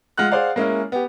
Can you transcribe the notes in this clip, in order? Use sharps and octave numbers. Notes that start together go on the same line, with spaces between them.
G#3 F4 F#5 F6 F#6
G#4 C5 D5 F5 F#5
G#3 A#3 C#4 E4
B3 G4